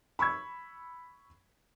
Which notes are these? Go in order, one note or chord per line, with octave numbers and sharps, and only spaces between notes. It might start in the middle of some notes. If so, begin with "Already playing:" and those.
B5 C#6 E6 G#6